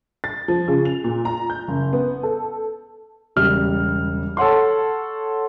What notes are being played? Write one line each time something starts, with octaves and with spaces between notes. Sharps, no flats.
A6
F3
C#3
F7
A#2
A#5
G6
F#1
B3
A4
E1 C#3 G3 F6
A4 C#5 F#5 C6